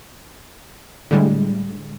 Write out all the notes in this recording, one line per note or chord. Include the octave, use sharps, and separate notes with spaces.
A2 D3 G3 G#3